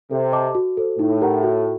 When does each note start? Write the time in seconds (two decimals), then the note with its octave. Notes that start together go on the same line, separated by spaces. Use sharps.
0.11 C3 A4
0.32 C5 D#5 A5 D6
0.55 F#4
0.77 A4 C5
0.99 A2 D#4
1.21 G4 A#4 F#5 A#5
1.43 F#4